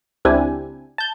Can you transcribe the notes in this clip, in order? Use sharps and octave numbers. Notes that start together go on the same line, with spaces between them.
C#2 C4 D4 E4 G4 G#5
A5 G6